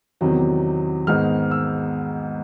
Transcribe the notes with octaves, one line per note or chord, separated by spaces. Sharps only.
E2 C3 D#3 F#3
G#2 D#3 G#3 B3 F6
E6